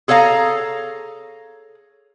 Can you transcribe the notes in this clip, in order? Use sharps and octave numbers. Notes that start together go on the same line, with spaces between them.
G#4 A4 C#5 F5 A#5